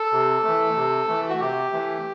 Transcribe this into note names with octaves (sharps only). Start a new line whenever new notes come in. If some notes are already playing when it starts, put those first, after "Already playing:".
Already playing: A4
C3
E3 A3
C3
E3 A3
F#4
C3 G4
E3 A3